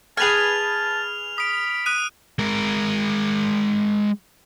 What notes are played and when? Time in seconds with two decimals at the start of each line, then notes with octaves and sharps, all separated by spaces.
0.17 G#4 B4 G#5 A5 F6 F7
1.38 B5 D#6 D7
1.86 D#6 F#6 D#7
2.39 G#3 A#4